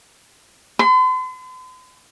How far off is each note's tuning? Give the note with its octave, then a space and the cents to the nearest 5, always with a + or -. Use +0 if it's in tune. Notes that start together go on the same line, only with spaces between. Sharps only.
C6 -45